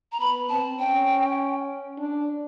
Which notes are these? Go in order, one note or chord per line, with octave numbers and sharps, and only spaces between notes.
A#5
B3 B5
C4 A5
C#4 G5
D4